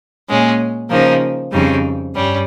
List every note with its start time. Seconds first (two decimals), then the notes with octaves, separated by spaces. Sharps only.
0.28 A#2 G#3 C#4
0.90 C#3 F3 A#3 D#4
1.52 F2 C#3 G3 C4 D#4
2.14 G2 G3 C#4